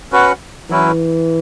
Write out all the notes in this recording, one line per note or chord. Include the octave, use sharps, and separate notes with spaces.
C#4 F#4 B4 F#5
E3 F#3 C#4 E4 B4